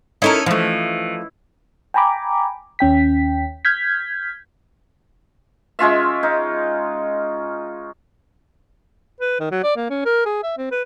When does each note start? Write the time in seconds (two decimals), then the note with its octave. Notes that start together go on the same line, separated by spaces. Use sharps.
0.22 C#4 D#4 E4 A4 A#4
0.46 E3 F3 A3
1.94 G5 G#5 A#5 B5 D6
2.79 D#2 C#4 G5 B6
3.65 F6 G6 G#6 B6
5.79 G#3 C#4 F4 E5
6.23 D#4
9.21 B4
9.40 D#3
9.51 F#3
9.64 D5
9.76 A#3
9.90 C#4
10.06 A#4
10.26 G#4
10.44 E5
10.58 C4
10.72 B4